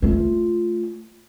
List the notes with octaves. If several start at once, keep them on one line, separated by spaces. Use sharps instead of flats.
A3 F4